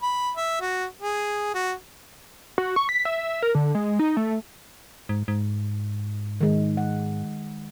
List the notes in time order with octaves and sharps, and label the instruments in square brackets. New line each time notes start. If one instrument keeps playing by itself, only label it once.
[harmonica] B5
E5
F#4
G#4
F#4
[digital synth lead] F#4
C#6
B6
E5
A#4
D3
G#3
D#4
A3
[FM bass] G#2
G#2
[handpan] D#3 G#3
F#5